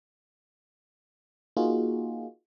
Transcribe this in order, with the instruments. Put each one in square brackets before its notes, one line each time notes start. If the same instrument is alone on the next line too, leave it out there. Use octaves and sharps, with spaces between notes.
[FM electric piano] A#3 D#4 F4 F#4 G#4